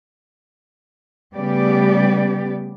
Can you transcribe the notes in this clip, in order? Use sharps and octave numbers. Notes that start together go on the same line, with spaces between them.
C#3 G3 A3 B3 G4 D5